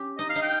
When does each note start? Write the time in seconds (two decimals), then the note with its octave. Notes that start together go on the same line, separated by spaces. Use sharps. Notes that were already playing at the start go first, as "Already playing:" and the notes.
Already playing: C#4 G4
0.18 D#4 D#5
0.30 F5
0.36 D#4
0.42 G5